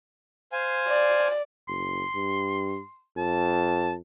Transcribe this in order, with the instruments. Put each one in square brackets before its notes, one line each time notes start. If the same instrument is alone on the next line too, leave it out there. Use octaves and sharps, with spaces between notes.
[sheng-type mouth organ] C5 F5 G#5
[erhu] D5
[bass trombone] F#1 [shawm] C6
[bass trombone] G2
[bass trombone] F2 [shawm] A5